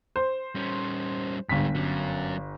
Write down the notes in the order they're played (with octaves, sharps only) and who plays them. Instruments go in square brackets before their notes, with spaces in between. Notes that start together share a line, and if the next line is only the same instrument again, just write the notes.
[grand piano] C5
[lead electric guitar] G3 C#4
[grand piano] G1 B6 [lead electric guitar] G#2 G3
[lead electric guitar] F#3 C#4